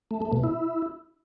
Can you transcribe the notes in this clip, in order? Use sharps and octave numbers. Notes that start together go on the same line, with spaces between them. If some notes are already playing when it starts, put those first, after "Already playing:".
A3
A3
B2
E4